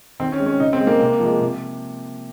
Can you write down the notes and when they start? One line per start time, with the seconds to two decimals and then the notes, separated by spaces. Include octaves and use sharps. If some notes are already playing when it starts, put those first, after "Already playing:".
0.20 D#3 C4
0.32 C#4
0.39 G#3
0.46 C#4
0.60 C#3 D#4
0.73 C4
0.80 G#3
0.87 A#3
1.01 C3
1.20 F3 G#3
1.41 C3